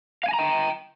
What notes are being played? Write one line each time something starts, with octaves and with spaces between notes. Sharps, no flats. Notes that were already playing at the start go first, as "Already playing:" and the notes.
F5 G5 G#5 A#5